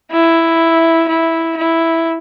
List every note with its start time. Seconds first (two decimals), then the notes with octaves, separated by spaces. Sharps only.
0.12 E4
1.09 E4
1.57 E4